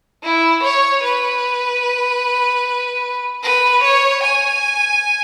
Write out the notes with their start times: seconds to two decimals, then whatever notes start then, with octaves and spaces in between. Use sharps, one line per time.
0.23 E4
0.63 C#5
1.03 B4
3.43 B4
3.83 C#5
4.23 G#5